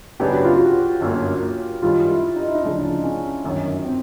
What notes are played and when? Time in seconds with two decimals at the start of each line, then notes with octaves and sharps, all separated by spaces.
0.20 F#2 C#3 F#3 B3 D4 G4
0.32 F#4
0.44 F4
0.56 F#4
1.01 G1 F#2 D3 F#3 A#3
1.82 F#2 D#3 G3 F4
2.09 E4
2.36 D#4
2.46 E4
2.55 D#4
2.62 D2 C#3 F3 G#3 D4
3.04 C#4
3.44 G1 F#2 D#3 F#3
3.85 C4